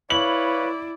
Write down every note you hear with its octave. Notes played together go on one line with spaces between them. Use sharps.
E4 B4 C#5 D5 F5 F#7